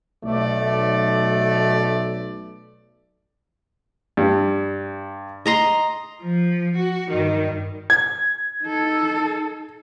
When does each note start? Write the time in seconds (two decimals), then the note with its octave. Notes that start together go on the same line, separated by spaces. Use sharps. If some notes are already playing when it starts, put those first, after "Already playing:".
0.25 B1 A3 D5
4.17 G2
5.46 D#5 A#5 C6
6.22 F3
6.76 F#4
7.10 G2 D#3
7.90 G#6
8.63 D#4 A4